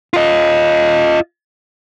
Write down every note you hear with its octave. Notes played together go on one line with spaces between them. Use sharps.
F4 D#5